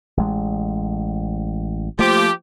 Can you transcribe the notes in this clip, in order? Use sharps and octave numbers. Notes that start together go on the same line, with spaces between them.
A1 G#3
F3 A3 A#3 G4